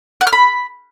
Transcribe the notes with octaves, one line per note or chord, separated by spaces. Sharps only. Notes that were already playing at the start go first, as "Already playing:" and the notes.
F#5
F6
B5